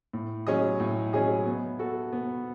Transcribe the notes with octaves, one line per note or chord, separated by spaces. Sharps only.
A2
F#3 C#4 G#4 D#5
A2
F#3 C#4 G#4 D#5
B3
F#4 A4
B3